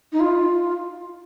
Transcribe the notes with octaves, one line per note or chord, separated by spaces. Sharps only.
D#4
F4